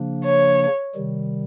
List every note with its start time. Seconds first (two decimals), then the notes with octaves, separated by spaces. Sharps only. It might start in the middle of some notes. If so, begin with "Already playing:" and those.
Already playing: C#3 F3 A#3 D4
0.24 C#5
0.95 C3 D#3 G3